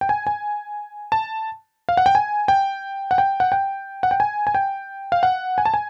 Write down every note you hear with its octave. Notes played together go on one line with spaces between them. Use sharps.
G5
G#5
G#5
A5
F5
F#5
G5
G#5
G5
F#5
G5
F#5
G5
F#5
G5
G#5
G#5
G5
F5
F#5
G#5
A5
G#5